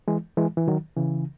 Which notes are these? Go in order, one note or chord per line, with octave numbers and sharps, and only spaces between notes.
E3 G#3
E3 G#3
E3
D#3 F#3
C#3 E3